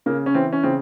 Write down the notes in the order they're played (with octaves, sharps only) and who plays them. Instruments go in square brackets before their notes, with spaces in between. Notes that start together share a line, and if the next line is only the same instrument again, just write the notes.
[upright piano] C#3 [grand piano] A#3
[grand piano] C#4
[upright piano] E3 [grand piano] C4
[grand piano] C#4
[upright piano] C#3 [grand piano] C4